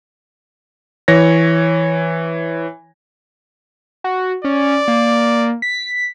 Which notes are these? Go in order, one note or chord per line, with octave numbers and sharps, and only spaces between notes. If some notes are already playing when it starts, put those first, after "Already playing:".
E3 C#5 A#6
F#4
C#4 D5
A#3
B6